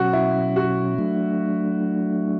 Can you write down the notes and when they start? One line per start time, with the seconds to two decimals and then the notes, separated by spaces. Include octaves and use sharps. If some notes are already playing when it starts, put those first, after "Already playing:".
Already playing: B2 F#3 C#4 F#4 F#5
0.13 E4
0.56 F#4
0.98 F#3 A3 D4